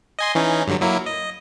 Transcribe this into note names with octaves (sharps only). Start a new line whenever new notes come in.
D#5 G#5 C6
E3 C#4 D#4
G2 D3 F#3
F#3 A#3 E4
D#5